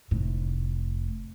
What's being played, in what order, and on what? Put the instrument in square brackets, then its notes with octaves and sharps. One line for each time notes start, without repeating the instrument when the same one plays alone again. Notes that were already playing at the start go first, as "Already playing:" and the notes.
[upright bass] F1 A2